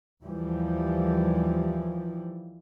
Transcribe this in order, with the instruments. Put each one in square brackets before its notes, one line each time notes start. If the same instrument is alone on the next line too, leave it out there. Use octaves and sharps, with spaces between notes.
[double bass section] D#2 E3 F3 G3